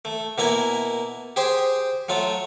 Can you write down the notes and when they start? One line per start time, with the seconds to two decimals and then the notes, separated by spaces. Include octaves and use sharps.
0.05 A3
0.38 B2 A#3 E4 G#5
1.36 G4 G#4 C5 G5
2.09 F#3 A3 F4